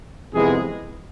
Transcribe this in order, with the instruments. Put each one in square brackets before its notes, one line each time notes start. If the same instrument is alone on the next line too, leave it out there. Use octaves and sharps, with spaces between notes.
[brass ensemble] F2 C3 E3 G#3 B3 E4 G#4